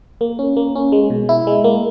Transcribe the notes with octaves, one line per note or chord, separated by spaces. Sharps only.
A#3
C#4
A#3
C#4
G#3
B2
E4
G#3
A#3